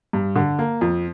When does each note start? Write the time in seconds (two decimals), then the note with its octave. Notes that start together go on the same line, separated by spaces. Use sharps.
0.13 G2
0.36 D3
0.59 A#3
0.81 F2